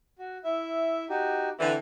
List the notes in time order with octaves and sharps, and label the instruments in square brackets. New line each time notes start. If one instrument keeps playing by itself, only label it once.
[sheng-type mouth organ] F#4
E4 E5
D#4 F#4 G4
[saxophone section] D3 E3 [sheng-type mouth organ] C4